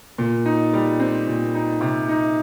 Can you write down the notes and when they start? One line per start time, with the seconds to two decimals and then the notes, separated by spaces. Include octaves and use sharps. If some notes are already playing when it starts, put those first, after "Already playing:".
0.18 A#2
0.45 D#4
0.73 G3
1.00 C4
1.27 A#2
1.55 D#4
1.81 C3
2.09 D#4